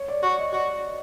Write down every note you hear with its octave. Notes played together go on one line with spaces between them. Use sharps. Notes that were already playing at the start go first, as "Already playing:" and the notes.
Already playing: C#5
D5
F#4 D5
D#5
F#4 D5